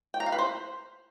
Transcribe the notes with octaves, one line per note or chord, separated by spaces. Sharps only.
G5
A#5
F5
B4
C5